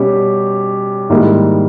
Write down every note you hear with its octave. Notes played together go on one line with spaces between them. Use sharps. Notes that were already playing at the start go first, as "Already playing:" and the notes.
Already playing: B2 G3 C#4 G4
G#2 D#3 G3 A#3 E4